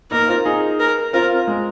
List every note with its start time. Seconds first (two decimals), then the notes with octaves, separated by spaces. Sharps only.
0.11 A#3 D#4 A#4
0.28 C4 F4
0.45 D#4 G#4
0.79 A#4
1.13 C4 F4 A#4
1.48 G#3